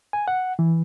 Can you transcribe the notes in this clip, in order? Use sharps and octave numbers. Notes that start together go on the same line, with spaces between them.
G#5
F#5
E3